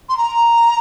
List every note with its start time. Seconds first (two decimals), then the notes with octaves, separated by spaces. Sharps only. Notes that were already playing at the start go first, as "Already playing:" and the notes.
0.09 C6
0.17 A#5